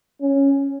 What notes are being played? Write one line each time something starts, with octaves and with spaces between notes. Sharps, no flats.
C#4